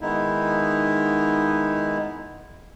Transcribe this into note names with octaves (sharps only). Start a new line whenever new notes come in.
D#3 G#3 B3 D#4 E4